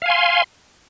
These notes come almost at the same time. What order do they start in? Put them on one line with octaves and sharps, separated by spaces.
F5 G#5 C6